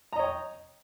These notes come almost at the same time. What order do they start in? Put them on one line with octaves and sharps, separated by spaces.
A#5 D#5 C#5 G5